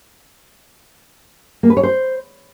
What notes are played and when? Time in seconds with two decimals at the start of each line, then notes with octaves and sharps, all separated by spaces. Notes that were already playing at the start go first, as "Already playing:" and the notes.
1.63 A#3
1.70 B4
1.77 C#5
1.83 C5